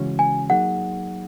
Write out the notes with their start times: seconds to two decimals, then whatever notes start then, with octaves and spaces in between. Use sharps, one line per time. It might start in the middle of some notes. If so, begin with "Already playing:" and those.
Already playing: C#3 E3 G#3 C#4 F#4
0.19 G#5
0.50 F#3 A#3 D#4 G#4 F#5